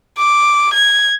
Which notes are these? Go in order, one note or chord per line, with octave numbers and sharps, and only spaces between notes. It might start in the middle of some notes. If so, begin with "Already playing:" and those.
D6
G#6